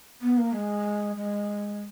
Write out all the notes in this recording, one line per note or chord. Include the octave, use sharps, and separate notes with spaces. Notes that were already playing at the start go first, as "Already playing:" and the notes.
B3
A#3
G#3
G#3